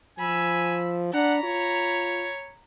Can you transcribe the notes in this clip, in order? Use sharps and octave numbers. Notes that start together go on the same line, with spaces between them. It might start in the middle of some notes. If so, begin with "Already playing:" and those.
F3 G#5 B5 E6
D4 F#5 A#5 B5
F4 C#5